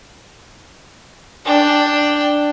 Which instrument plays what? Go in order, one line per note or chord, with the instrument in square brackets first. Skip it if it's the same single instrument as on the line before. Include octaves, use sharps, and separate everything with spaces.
[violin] D4 G5